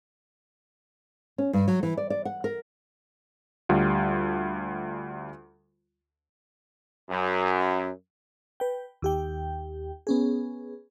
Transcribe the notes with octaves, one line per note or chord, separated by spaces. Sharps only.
C#4
G2
F#3
E3
D5
D5
F#5
A#4
D2 G3 F4
F#2
B4 G5
D#2 G4 G5
B3 C#4 G#4